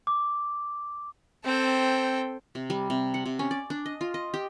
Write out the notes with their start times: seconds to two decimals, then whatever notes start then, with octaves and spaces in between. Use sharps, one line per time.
0.07 D6
1.45 C4 A4 G5
2.55 C3
2.70 G3
2.90 C3
3.14 F#5
3.26 C3
3.39 C#4
3.51 D5
3.70 D4
3.86 D#5
4.01 F4
4.14 D#5
4.34 G4